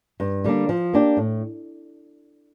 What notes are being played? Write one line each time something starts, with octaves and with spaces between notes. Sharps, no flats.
G2
D3 G3 A#3 D4
F3
A#3 D4 G4
A2